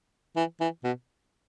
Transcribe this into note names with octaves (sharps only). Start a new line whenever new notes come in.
E3
E3
B2